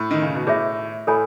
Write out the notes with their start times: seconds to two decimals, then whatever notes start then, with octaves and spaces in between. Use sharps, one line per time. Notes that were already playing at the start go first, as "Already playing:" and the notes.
Already playing: A2
0.11 D#3
0.22 C#3
0.35 B2
0.47 A2 G#4 C#5 E5
1.07 A2 A4 C#5 G#5 B5